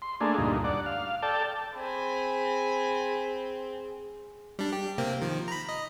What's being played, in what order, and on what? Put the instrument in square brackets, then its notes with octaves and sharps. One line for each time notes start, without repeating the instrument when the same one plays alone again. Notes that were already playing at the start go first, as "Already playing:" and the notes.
[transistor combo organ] C6
A3 A#3 D4 G#4
D2 G2 A#2 D#4
D5 F#5
F5
A4 D5 G5 A5
[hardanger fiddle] C4 [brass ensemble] G#4 [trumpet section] G#5 B5
[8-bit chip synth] G3 D4
G4
C3 A#3 C4
D#3 F3
A#5 B5
D#5